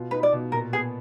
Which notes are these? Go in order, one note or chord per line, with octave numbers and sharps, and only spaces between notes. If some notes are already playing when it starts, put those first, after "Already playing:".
Already playing: B2 F4
D#4 B4
D5
B2
A#2 A#4
B3 G#4